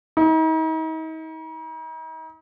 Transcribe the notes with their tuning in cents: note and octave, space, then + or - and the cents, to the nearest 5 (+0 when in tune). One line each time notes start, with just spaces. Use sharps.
D#4 +40